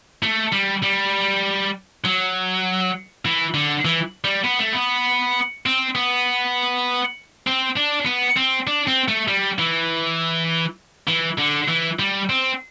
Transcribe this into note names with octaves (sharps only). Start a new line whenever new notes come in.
A3
G3
G3
F#3
E3
D3
E3
G3
B3
A3
B3
C4
B3
C4
D4
B3
C4
D4
C4
A3
G3
E3
E3
D3
E3
G3
C4